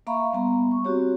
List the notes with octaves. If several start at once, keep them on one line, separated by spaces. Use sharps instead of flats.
A#3 E5 F5 A#5 B5 C#6
G3 B3 A#5 C6
C#6
C4 F#4 G4 C#5